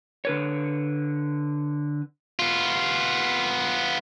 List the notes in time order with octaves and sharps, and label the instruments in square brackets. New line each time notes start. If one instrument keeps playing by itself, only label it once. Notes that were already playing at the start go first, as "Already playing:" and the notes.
[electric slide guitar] D3 B4 C#5
[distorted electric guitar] B3 F4